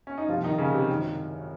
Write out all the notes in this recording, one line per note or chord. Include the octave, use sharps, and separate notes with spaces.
C#4
D#4
C2 C3 F3 F4
D#3 D#4
C#3 C#4
C3 C4
G#1 F#2 D#3